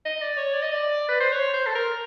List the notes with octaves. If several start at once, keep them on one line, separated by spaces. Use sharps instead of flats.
D#5
D5
C#5
D5
D#5
D5
B4
C5
C#5
C5
A4
A#4